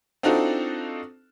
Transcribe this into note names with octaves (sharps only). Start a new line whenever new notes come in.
C4 D4 D#4 F4 F#4 A4